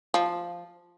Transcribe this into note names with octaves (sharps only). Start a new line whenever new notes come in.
F3